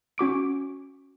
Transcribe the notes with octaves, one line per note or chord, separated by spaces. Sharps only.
C#4 F#4 D6 D7